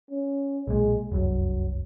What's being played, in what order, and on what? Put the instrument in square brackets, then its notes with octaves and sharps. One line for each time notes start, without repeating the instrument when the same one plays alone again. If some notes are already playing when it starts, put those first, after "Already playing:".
[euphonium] C#4
[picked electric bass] B1 A#2 [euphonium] G#3
[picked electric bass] F1 C2 F#2 [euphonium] F#3